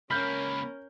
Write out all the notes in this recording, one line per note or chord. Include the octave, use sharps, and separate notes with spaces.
C#2 A#3 C#4 A#4 B5 F6 G6